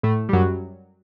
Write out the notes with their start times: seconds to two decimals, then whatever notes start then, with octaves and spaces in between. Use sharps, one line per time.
0.03 A2 A3
0.29 G3
0.33 F#2 F#3